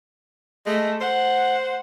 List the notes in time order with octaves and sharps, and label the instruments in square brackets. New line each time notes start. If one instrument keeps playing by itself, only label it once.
[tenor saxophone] G#3 [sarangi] A3
[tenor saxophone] C5 [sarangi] F#5